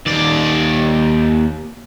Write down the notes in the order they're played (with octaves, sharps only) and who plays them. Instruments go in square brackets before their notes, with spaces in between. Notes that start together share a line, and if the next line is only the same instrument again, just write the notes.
[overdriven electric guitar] D#2 D5